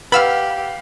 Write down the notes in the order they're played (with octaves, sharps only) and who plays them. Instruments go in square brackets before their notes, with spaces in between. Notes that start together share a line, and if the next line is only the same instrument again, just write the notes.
[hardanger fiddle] G4 [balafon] B4 [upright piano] F5 F#5 [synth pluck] B5 E6 F6